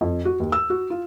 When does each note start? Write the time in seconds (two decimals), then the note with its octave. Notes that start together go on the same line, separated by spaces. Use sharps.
0.01 F2
0.25 F#4
0.40 D#2
0.52 E6
0.70 F#4
0.90 F4